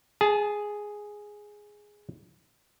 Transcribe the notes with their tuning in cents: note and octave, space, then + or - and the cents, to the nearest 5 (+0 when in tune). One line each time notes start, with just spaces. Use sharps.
G#4 +0 A5 -30